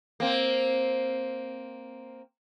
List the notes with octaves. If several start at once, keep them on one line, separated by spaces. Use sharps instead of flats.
A#3 C4